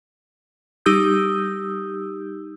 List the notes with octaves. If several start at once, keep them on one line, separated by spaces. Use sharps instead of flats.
G3 D#4 G4 D#6 E6 G6